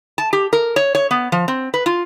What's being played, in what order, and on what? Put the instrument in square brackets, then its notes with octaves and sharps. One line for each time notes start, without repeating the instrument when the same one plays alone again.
[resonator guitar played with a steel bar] A5
G4
A#4
C#5
C#5
B3
F3
C4
B4
F4